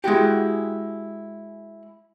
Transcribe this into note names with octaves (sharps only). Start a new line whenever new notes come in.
G#3 E4 F#4 G4